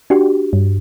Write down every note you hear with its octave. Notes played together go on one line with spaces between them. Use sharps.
D4 F#4 G4
G2